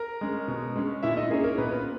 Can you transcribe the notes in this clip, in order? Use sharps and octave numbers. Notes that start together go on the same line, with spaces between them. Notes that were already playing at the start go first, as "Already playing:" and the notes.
Already playing: A#4 A#5
G#3 C#4
B2
G#3 C#4
A#2 E4 E5
D#4 D#5
A#3 C#4 G#4
A#4
A#2 B3 B4
B3 B4